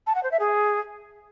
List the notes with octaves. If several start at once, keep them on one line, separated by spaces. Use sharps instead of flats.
A5
F#5
C5
E5
G#4